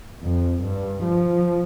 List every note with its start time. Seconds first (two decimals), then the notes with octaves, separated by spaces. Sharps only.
0.22 F2
0.63 G2
1.04 F3